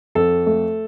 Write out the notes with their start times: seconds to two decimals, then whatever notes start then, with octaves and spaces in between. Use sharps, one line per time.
0.15 F2 A4
0.46 A3